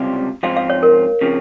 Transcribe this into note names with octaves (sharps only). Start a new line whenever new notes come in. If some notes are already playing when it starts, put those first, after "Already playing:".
Already playing: C#2 C3 G3 C4 F4
G#2 F3 C4 F4 F5
F5
C#5
A#4
C#3 F3 C4